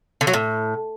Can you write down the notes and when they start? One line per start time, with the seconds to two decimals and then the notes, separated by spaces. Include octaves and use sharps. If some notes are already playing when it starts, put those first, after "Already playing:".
0.21 D3
0.27 F#3
0.33 A2